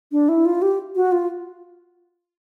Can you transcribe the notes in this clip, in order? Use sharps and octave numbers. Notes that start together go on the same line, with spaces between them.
D4
E4
F4
G4
F#4
F4